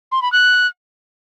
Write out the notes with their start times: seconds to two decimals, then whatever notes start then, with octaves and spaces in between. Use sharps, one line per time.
0.12 C6
0.22 B5
0.32 F#6